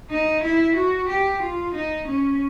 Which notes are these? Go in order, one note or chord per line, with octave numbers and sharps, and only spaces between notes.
D#4
E4
F#4
G4
F4
D#4
C#4